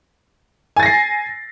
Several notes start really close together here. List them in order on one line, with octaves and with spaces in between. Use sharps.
G#5 A6 A#6 C7